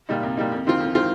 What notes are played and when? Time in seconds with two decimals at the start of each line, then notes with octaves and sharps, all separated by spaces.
0.09 A#2 G3 D#4
0.23 C2
0.37 A#2 G3 D#4
0.52 F2
0.67 D#3 C4 F4
0.80 F2
0.95 D#3 C4 F4